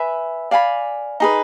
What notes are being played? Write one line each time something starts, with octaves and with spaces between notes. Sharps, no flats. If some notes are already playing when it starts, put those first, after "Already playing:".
Already playing: B4 E5 G#5
D5 F5 G#5 B5
D#4 G#4 B4